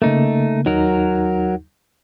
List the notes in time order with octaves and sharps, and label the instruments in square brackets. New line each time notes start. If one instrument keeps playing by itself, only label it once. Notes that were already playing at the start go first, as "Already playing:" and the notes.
[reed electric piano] C#3 A#3 [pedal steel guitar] A3 D#4
[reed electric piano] D#2 D#4 [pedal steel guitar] F#3 A#4